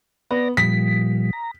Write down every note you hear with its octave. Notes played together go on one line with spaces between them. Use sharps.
B3 D5 A#6
A#2 F3 G3 B6
A#5